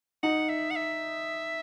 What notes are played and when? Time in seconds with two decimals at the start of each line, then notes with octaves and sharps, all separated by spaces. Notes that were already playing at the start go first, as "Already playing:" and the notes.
0.23 D#4 F#5
0.49 E5
0.71 F#5
0.76 E5